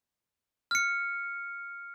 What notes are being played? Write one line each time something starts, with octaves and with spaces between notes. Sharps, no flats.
F6 C#7